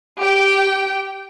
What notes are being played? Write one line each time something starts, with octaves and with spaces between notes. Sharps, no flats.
G4 G5